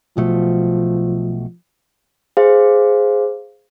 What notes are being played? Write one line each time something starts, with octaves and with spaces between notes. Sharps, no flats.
B1 B2 F3 A3
G#4 C5 F5